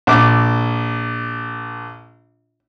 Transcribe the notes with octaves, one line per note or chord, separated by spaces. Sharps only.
A#1 D6